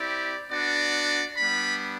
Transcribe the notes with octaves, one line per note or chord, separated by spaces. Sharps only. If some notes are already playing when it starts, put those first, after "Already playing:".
Already playing: C4 E4 G4 D5
B3 D4 F#4 D5
G3 B3 D4 B5